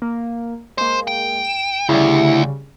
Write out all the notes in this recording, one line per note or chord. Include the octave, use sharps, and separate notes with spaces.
A#3
G#3 A#3 C5
G5
D7 E7
D2 C#3 G3 E4